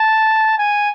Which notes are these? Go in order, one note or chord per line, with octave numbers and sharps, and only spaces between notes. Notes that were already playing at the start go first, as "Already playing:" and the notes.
Already playing: A5
G#5